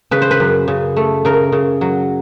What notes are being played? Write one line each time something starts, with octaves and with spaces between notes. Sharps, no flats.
C#3 B4
C5
B4
F#2
C#3
A3
C#3 A#4
C#3
F#3